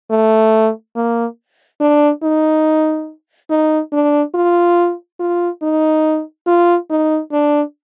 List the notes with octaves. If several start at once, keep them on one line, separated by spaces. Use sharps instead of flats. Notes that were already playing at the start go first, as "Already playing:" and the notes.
A3
A#3
D4
D#4
D#4
D4
F4
F4
D#4
F4
D#4
D4